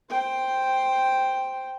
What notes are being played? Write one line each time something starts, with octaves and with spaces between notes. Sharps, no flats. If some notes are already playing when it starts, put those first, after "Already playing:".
C5 G5